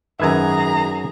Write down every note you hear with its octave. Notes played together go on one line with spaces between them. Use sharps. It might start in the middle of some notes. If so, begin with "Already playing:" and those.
G#1 F#2 G#4 B4 E5 A#5 G#6